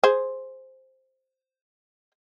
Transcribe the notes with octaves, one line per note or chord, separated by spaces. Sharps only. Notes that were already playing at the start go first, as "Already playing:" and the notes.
G#4 C5